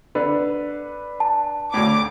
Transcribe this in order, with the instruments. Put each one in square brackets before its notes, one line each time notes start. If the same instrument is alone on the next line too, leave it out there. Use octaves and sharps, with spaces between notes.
[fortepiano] D3 [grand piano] D4 B4
[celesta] A5
[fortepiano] D2 A2 [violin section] D6